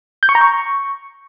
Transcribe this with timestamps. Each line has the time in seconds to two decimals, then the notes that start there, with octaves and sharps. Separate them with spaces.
0.23 G6
0.29 C#6
0.35 A#5
0.41 C#6